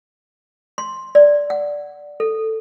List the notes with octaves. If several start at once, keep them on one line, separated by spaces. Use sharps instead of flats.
C6
D5
F#5
A4